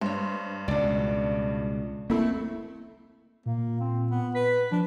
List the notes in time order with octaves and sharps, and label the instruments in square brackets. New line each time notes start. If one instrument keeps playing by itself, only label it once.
[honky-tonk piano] G2 [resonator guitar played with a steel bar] C5 C#5
[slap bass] C#2 B2 [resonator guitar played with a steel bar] D4 D5
[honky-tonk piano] A3 E4 [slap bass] A#3 C4
[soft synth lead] A#2 [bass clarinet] A#3
[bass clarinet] C4
B3
[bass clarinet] B4 [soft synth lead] B6
[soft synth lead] F3 [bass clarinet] D4